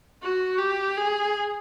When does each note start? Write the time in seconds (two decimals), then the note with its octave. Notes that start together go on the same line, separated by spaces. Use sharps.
0.23 F#4
0.59 G4
0.97 G#4